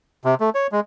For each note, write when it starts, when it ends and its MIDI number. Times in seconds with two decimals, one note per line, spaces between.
0.25 0.35 48
0.40 0.50 57
0.55 0.67 73
0.72 0.80 56